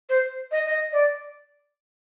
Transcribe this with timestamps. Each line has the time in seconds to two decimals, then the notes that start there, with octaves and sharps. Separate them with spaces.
0.09 C5
0.52 D#5
0.66 D#5
0.92 D5